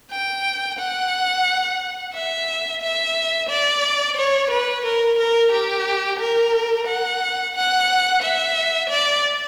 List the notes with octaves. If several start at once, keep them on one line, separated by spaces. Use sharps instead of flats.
G5
F#5
E5
E5
D5
C#5
B4
A#4
A#4
G4
A#4
F#5
F#5
E5
D5